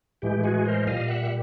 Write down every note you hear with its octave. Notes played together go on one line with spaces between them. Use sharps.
A2 E3 G#3 G4
F#4 G#4
A#4 C5
A#2 G3 D#5 F5
E5 F#5